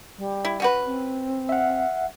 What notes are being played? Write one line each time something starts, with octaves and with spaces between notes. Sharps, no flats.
G3
E4
C#4 F#4 B4
C4
E5 F#5